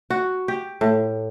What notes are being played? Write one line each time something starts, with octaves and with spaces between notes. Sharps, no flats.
F#4
G4
A2